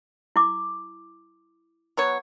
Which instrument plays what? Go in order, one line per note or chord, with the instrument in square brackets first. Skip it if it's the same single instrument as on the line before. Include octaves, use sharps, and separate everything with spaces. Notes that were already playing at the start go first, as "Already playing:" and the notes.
[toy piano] E4 D6
[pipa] F#3 B3 C#5